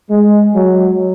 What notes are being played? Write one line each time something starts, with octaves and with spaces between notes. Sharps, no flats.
G#3
F#3